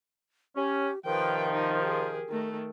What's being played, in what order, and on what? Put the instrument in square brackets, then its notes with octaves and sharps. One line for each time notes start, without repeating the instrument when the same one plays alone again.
[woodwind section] C#4 [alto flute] G4
[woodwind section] C3 D#3 F3 [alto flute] A#4 [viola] B4 G5
[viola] D#4
G4 G#4
D#3 A3